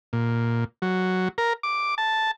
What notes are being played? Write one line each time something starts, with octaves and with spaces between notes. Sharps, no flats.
A#2
F#3
A#4
D6
A5